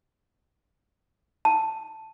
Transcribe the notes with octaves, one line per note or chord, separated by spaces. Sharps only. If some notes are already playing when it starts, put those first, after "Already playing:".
A5